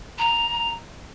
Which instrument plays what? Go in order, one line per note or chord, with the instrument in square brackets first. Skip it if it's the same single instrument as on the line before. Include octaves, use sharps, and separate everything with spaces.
[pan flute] A#5